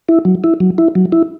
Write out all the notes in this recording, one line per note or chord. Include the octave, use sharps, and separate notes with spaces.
E4
F#3
E4
F#3
E4
F#3
E4